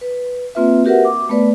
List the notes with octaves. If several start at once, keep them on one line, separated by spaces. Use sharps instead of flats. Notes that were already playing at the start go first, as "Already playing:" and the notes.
B4
A#3 C4 F4 B4 E5
F#4 G4 A#4 B4 E5 F#5
D6
A3 B3 B4 D5